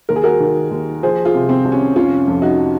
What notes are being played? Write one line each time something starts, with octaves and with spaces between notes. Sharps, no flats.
D#2 A#4
G#4
F#4 A#4
D#3
D#2
F3 G#4 C5
F4 G#4
C3
C4
C2
C#4
F1 C#4 F4
F2
D#4 F#4